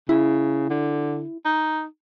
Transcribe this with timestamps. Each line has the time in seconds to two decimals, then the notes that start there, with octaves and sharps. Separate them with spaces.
0.09 C#3 E4
0.70 D3
1.45 D#4